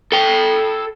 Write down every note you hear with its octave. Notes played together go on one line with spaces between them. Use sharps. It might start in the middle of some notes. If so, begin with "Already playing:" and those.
A4 G5